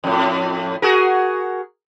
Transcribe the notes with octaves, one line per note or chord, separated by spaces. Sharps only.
F2 A2
F#4 G#4 A#4